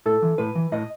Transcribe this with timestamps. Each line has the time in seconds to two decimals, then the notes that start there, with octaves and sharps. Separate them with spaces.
0.06 A2 A4
0.22 E3
0.38 A2 B4
0.55 E3
0.72 A2 D#5